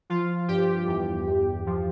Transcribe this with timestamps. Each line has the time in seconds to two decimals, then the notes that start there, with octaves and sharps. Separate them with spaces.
0.10 F3 F4
0.48 G2 G4
0.87 E2
1.27 E2
1.66 F3